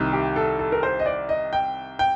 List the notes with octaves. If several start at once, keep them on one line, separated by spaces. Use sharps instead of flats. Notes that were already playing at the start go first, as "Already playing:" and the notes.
Already playing: C2 C3 D#3
G4
A4
A4
A#4
C5
D#5
D5
D#5
G5
G5